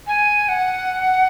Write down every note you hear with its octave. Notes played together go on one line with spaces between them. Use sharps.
G#5
F#5